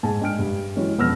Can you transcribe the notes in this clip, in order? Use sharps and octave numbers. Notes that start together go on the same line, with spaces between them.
G#2 G#4 G#5 A5
G#3 D4 G5 F6 D7
G2
E3 F#3 G#3 C#4
E1 F2 B3 E6 F6 A#6